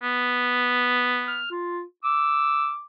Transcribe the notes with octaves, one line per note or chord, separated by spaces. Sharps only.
B3
F6
F4
D6 E6